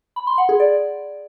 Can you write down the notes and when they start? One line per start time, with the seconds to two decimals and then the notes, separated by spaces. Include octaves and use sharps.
0.16 B5
0.27 C6
0.38 F#5
0.49 G#4
0.60 D5